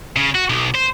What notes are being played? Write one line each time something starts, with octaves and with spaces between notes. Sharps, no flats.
C#3
F#4
B1
C5